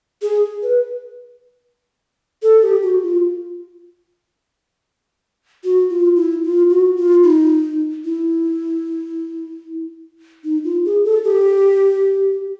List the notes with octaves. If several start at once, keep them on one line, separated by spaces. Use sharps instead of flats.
G#4
B4
A4
G4
F#4
F4
F#4
F4
E4
F4
F#4
F4
D#4
E4
D#4
F4
G#4
A4
G4